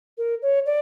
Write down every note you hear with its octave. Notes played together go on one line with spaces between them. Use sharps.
A#4
C#5
D5